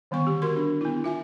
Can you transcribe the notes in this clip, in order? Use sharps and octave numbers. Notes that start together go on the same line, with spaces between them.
D3 D#3 G3 B3 C#6
G4
F#4 A#4 C6
D4
B3 E4
F4 E5 G#5